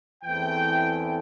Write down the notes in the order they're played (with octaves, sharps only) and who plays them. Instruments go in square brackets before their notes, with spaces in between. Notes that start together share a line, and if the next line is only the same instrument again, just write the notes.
[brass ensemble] E2 E3 A3 C4 G5